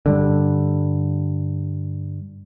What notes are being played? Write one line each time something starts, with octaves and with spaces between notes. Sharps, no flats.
G2 D3